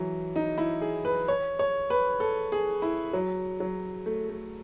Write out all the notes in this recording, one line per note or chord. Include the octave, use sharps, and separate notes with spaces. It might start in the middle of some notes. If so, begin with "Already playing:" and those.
Already playing: E3 F#3
D#4
E4
G#4
B4
C#5
C#5
B4
A4
G#4
E4
F#3
F#3
A3
A3